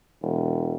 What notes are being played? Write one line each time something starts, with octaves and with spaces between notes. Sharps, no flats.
E1